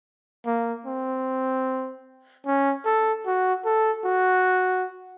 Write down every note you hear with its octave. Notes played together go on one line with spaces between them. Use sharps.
A#3
C4
C#4
A4
F#4
A4
F#4